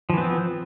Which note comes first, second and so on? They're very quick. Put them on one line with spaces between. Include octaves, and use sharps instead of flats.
F3 E3 B3 C4